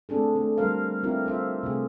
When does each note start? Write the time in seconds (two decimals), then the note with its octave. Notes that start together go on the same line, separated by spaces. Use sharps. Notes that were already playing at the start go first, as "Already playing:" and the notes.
0.09 A3 C4 D4 G#4 A4
0.35 A3 C4
0.58 G3 A3 D4 A#4 C5 F5
1.03 C4 D4 E4 F4 G4 A#4
1.26 F4 C5 E5
1.63 C3 A3 G#4